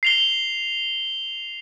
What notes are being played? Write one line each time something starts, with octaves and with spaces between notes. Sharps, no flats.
C7 F7 G7